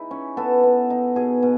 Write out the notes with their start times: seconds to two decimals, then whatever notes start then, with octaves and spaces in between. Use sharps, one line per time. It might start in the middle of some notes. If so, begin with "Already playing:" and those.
Already playing: D#4 E4 G#4
0.11 C#4
0.37 B3 A4
0.63 B3
0.90 D#4
1.16 B2 G#4
1.43 B2